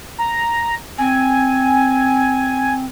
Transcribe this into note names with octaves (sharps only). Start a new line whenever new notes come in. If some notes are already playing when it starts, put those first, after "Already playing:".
A#5
C4 G#5